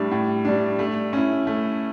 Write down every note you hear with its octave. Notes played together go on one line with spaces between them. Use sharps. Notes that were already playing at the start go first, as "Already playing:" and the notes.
Already playing: A2 G3 D4
A2
G3 D4
A3
C#4 E4
A3